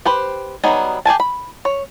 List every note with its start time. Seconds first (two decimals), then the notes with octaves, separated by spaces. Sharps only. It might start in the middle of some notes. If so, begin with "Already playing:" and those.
0.05 G4 B4 C5
0.64 F#3 G3 B3 D#4 G#4
1.05 G4 G#4 G#5 A5
1.20 B5
1.65 C#5